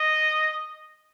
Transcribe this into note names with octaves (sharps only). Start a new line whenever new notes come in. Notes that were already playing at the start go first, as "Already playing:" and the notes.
Already playing: D#5